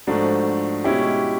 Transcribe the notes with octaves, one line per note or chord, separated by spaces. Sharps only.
G#2 F3 A3 D4 F#4
B2 G#3 C#4 E4 G4